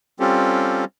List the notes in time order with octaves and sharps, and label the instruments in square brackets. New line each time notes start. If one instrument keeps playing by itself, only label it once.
[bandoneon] G3 C4 C#4 F4 G4 A4